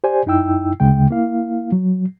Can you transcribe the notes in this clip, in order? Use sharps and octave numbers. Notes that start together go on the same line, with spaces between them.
G4 C5 D5 G#5
F#2 D#4 E4 G5 E6
D2 C#3 G#3 G5
A#3 E4 F5
F#3